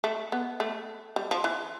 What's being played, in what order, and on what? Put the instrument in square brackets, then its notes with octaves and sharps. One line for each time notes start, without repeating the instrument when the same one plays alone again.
[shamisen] A3
B3
A3
G3
F3
E3